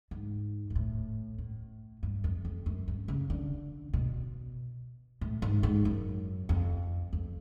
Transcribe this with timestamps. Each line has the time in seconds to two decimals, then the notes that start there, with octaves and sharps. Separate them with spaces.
0.11 G#2
0.70 G#2
0.75 A2
1.38 A2
2.03 G2
2.24 F2
2.45 F2
2.66 F#2
2.88 G2
3.08 C#3
3.30 D3
3.93 B2
5.21 A2
5.42 G#2
5.63 G#2
5.85 F#2
6.49 F2
7.13 F2